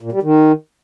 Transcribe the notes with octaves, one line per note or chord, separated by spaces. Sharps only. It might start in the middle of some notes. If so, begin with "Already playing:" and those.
A#2
G3
D#3